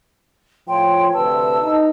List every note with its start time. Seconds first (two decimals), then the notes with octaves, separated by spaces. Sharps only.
0.68 A2 F3 C#5 G5 C6
1.13 D2 C3 B4 A5 E6
1.59 D#4